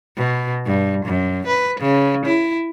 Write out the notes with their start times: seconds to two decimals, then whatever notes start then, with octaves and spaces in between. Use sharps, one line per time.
0.17 B2
0.66 G2
1.06 F#2
1.47 B4
1.80 C#3
2.26 E4